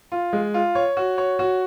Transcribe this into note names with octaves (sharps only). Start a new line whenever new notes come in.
F4
G#3
F4
C#5
F#4
C#5
F#4